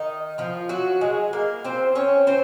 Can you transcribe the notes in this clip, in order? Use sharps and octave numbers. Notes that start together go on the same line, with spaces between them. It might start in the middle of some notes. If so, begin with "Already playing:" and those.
Already playing: D#3 D#4
F3 F4
F#3 F#4
G#3 G#4
A#3 A#4
C4 C5
C#4 C#5
C4 C5